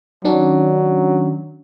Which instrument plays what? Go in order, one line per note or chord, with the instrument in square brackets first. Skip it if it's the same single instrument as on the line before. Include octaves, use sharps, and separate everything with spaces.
[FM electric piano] D#3 C#4 D4 [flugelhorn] F#3